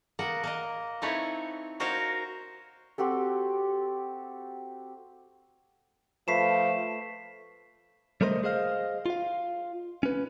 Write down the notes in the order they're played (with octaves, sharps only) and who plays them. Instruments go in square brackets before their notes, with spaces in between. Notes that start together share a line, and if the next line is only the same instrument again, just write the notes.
[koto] A#3 B3 A#4 F#5
A#3 A#4 D#5
C4 D#4 E4 A4 B4 C#5
F#4 A#4 C5 C#5 D#5 F5
[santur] C4 F#4 G4 A4
[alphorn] F3 [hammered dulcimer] A3 B4 D6 [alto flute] F5 [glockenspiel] B6 C7 E7
[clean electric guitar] G3 A3 A#4 C5 D#5
G#4 C5 D#5 F5
F4 F5
C#4 B4